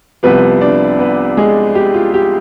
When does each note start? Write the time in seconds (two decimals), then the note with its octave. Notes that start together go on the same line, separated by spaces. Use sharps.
0.23 C2 C3 F3 B3 B4
0.61 D4 D5
0.99 B3 B4
1.37 G#3 G#4
1.75 G4
1.94 F4
2.14 G4